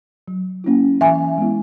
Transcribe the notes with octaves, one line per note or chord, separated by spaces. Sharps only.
F#3
A#3 C#4 E4
E3 E5 G#5
G#3 B3 E4